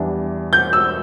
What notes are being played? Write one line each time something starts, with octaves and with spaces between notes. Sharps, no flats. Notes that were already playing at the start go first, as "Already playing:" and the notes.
Already playing: E2 E3 G3 D4
G6
E6